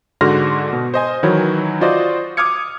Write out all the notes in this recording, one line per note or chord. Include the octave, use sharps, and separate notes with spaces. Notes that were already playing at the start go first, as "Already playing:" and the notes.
G#2 D3 F#4 C6 F6 A#6
B2
C5 D#5 G#5
D#3 E3 F#3 E4 F#4 C#5
F4 F#4 C5 D5 D#5
D6 D#6 F6 G#6 C#7